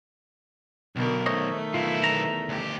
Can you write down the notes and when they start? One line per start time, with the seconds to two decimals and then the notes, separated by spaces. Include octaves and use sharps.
0.96 B1 B2 D3 A#4
1.26 D#3 A3 C5 C#5 D#5
1.74 B1 E4 F4
2.04 E2 A#5
2.49 D2 G4